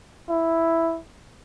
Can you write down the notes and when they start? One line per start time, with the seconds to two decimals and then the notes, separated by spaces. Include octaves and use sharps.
0.29 E4